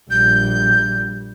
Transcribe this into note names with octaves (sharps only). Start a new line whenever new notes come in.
A#1 G3 G6